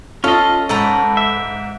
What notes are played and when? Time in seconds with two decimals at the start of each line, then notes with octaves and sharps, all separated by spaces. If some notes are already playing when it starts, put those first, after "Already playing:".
0.24 C#4 F4 A4 D#5
0.69 G#2 A4 B4 A#5
1.17 E5